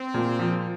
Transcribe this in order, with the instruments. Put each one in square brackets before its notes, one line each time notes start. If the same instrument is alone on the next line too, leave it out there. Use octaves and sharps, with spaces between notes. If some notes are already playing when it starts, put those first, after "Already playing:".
Already playing: [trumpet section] C4
[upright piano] A#2
F3